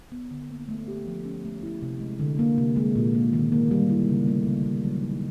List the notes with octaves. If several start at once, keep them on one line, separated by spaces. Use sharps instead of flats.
B3
D3
A#3
A3
G4
F3
C#4
A3
E4
C3
G#3
D3
A#3
C3
G#3
A#2
A#3
D#3
A#3
G3
E4
C#3
A3
C#3
A3
F#3
D#4